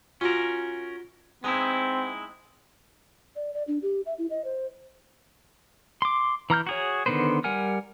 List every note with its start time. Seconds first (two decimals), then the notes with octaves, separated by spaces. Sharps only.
0.21 C#4 F4 F#4 A#4
1.44 G#3 B3 C4 D#4 E4
3.36 D5
3.54 D5
3.67 D4
3.82 G4
4.06 E5
4.18 E4
4.30 D#5
4.45 C5
6.02 C6 D6
6.50 E3 A#5 F6 G6
6.67 F#4 G#4 C#5
7.06 D3 D#3 B3 B4 C5
7.44 G3 A#4 F#5 G#5 F6